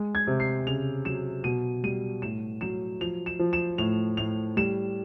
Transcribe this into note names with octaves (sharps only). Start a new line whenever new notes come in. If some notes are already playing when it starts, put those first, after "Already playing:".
Already playing: G#3
G#6
C3
C7
C#3 F7
F#3 E7
B2 D#7
G3 D#7
A2 E7
F#3 E7
F3 F7
E7
F3
E7
A2 F7
A2 F7
G3 E7